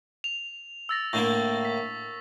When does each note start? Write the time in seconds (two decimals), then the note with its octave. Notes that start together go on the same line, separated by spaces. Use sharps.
0.24 F7
0.89 E6 A6 A#6
1.13 A2 D3 A#3 C#6 A#6
1.65 B6